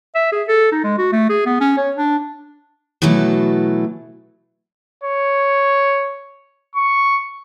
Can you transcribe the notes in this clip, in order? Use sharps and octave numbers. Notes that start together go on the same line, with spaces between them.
E5
G#4
A4
D#4
G#3
F#4
A3
G#4
B3
C#4
C#5
D4
B2 E3 F#3 A3 A4
C#5
C#6